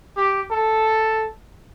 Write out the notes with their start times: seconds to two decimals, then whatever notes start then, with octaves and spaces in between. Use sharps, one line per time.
0.17 G4
0.51 A4